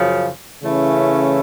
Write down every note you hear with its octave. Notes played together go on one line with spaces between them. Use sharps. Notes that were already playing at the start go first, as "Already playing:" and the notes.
Already playing: F#2 C#3 F3
C#3 E3 A3 C#4 E4